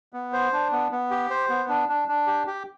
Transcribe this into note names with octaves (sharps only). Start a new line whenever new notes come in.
B3
C5
D4
B3
B3
G4
C5
B3
D4
D4
D4
G4
G4